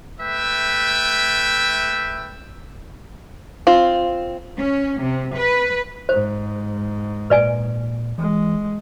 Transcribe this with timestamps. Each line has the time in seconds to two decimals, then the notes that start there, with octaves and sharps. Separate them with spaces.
0.21 A3 B4 E5 G5
3.67 C4 F4
4.58 C#4
5.02 C3
5.37 B4
6.09 G#2 C5
7.30 A#2 B4 D5 G#5
8.18 E3 G#3